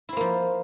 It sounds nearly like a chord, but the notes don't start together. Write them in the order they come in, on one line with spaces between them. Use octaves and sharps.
E4 C4 A#3 F3